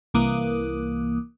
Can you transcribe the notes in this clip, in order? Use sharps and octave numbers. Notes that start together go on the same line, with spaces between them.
C2 E3 A#3 D6 D#6 F#6